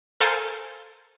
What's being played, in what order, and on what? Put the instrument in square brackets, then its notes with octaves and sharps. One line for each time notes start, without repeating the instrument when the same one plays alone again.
[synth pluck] A4 A#4 C5 F5 G#5 A5